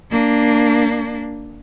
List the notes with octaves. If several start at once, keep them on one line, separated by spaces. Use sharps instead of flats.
A#3 D4